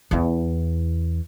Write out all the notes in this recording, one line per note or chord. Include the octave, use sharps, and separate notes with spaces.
E2 E4